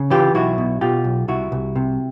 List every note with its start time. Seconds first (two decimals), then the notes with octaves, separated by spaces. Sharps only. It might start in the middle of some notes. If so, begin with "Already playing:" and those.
Already playing: C#3
0.10 E3 F4 G4
0.34 B1 E4 F#4
0.58 B2
0.81 B2 F4 G4
1.04 B1
1.28 C2 E4 F#4
1.52 C2
1.76 C3